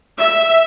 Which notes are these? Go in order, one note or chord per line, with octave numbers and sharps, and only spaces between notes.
E5